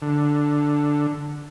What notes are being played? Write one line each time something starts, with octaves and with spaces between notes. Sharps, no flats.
D3